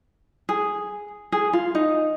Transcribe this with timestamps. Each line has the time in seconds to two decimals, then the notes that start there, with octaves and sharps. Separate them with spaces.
0.49 G#4
1.32 G#4
1.53 F4
1.75 D#4